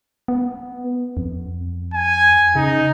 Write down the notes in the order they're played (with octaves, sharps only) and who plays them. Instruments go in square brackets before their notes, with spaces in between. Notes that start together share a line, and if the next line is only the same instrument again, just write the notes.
[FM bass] B3
F2
[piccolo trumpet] G#5
[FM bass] C#3 [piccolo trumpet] D#4